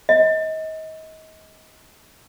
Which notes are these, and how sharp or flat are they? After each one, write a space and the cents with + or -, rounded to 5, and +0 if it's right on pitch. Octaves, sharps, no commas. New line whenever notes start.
D#5 +30